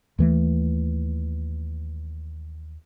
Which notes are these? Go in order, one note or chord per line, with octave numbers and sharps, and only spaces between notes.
D#2 E3 A3